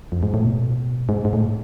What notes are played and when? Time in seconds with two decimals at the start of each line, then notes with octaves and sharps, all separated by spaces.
0.12 F2
0.23 G#2
0.34 A2
0.44 B2
1.09 G#2
1.25 G#2
1.33 A2